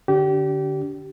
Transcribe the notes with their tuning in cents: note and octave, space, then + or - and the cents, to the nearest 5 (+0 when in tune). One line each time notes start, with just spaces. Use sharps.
D3 +0 D4 -35 G4 -30